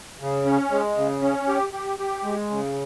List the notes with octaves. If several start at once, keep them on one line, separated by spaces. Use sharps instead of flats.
C#3
C#4
G#3
C#3
C#4
G4
G4
G4
G#3
C#3